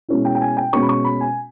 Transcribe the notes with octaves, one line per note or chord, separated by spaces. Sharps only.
B2 G#3 C#4 E4
G5
G5
G#5
G5
B2 G#3 C#4 C#6
B5
C#6
B5
G#5